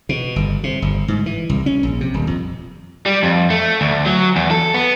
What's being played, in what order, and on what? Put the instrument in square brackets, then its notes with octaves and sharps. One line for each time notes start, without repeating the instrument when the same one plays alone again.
[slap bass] B2
G1
C3
G1
G#2
E3
C2
C#4
A#1
C3
D#1
F2
[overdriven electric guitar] G3
F2
A3
D2
F#3
E2
A4
B3